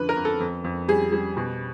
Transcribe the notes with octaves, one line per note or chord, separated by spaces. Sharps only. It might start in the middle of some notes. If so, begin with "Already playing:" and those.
Already playing: F2 D3 F3 B4
A#4
F2
A4
F2
F2
G3 G#4
G3
B2